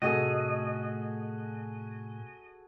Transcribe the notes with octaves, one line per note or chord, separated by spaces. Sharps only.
A2 C3 A3 F#4 G#4 A4 D#5